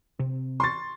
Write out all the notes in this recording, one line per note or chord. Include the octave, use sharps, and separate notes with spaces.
C3 C4
C6 C#6 A6